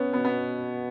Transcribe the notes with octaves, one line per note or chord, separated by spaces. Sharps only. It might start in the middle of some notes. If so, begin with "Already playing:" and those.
Already playing: B3 C#4
B2 B3
B3